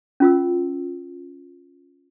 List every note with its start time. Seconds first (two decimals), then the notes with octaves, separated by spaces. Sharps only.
0.20 C#4 F4 E6